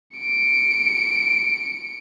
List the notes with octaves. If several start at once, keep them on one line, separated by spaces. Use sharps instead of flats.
C#7 D7